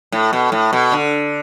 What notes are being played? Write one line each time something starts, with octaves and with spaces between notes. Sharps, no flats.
A2
B2
A2
B2
D3